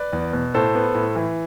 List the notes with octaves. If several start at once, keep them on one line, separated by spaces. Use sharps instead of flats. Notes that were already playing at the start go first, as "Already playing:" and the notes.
Already playing: B4 D5
E2
B2
A2 A4 C5
B3
A2
E3